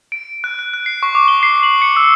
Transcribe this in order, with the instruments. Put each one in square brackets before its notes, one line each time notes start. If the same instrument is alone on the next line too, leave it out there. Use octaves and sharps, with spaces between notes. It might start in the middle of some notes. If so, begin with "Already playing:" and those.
[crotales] D7
F#6
F#6
F#6
C7
C#6
D6
G7
C7
F#7
C#7
E6